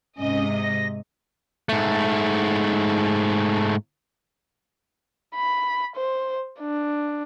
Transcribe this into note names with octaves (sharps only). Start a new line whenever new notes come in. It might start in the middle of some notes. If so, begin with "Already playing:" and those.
G#2 C3 C#4 D#5
A#6
G#2 A3
B5
C5
D4